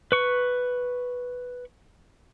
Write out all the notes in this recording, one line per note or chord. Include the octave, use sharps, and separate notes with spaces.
B4 C#6